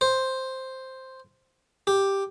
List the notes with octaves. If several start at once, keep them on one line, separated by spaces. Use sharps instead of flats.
C5
G4